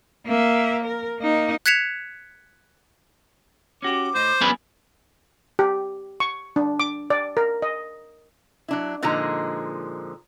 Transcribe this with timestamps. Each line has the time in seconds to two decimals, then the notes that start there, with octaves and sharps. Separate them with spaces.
0.27 A#3 E5
0.84 A#4
1.20 A#3 D#4
1.66 F#6 G#6 B6 C#7 E7 F7
3.82 C#4 F#4 G4 D6
4.15 A2 C5 D#5
4.41 F#2 B3 D4 G#4 B5
5.59 G4
6.20 C#6
6.56 D4
6.80 D6
7.10 D5
7.37 A#4
7.62 D#5
8.68 F#3 D4 E4
9.02 A#2 D3 F3 G#3 D#4 A#5